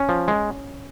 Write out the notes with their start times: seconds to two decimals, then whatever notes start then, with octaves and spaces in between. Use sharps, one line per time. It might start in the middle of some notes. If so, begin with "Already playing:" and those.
Already playing: C#4
0.09 F3
0.28 G#3